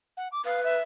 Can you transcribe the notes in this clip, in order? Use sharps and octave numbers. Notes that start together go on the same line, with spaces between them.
F#5
D6
B4 F5
E5